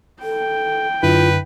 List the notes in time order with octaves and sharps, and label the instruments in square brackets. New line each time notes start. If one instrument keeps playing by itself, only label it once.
[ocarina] A4 [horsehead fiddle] G5
[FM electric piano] F#2 D3 E4 [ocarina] F4 [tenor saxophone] B4